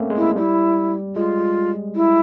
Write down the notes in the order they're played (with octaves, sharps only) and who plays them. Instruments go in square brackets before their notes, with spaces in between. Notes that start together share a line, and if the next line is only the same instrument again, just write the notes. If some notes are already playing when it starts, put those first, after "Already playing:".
Already playing: [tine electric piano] A3 A#3 C4 C#4
G#3
[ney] E4
[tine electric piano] G3 [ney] E4
[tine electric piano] G#3 [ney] F4
[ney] E4